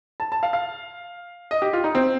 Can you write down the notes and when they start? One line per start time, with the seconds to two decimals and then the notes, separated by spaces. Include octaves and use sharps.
0.20 A5
0.32 A5
0.43 F5
0.53 F5
1.51 D#5
1.62 G4
1.73 F4
1.84 D#4
1.95 C4